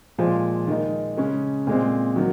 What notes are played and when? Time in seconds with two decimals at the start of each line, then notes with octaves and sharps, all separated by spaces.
0.18 A#2 F3 G#3
0.67 D#3 G#3 D#4
1.17 C#3 G#3 C#4
1.67 A#2 G#3 C4
2.16 D#3 F#3